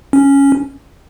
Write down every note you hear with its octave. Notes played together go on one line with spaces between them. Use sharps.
C#4